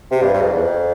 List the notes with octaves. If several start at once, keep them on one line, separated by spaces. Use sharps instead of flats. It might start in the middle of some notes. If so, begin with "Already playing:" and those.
C3
G2
G2
F2
E2
F2